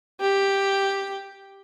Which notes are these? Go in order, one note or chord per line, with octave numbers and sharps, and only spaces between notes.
G4